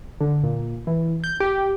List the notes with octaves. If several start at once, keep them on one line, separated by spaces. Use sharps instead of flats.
D3
A#2
E3
G6
G4